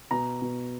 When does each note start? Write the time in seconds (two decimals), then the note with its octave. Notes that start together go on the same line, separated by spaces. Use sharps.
0.11 B2 A#5
0.42 B2